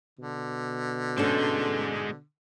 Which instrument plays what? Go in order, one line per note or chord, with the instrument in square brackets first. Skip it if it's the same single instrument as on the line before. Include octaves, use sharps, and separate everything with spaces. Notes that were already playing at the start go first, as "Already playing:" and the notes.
[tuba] B2 [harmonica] D3
[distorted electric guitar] G#3 C5 [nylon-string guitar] C#4 D4 A4